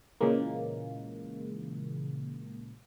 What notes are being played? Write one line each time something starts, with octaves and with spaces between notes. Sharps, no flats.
A#2 C#3 E3 G#3 A#3